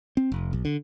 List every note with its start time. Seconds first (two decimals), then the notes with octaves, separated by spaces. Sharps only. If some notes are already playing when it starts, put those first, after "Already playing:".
0.17 C4
0.32 F1
0.53 B1
0.65 D3